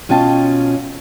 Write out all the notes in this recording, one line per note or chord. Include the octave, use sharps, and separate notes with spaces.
B2 C#4 F4 G5 A5